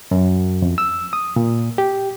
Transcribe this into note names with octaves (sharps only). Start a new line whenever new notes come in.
F#2
F2
E6
D#6
A#2
G4